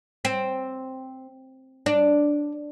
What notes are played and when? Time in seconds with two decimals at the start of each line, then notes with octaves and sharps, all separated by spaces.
0.25 C4
1.86 D4